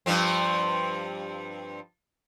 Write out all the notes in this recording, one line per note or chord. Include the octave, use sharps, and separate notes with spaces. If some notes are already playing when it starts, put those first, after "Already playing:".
G2 F3 C4